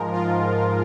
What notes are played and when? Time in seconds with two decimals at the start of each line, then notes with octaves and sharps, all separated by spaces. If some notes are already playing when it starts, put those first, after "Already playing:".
Already playing: G#2 F3 G#3 A#4
0.12 F4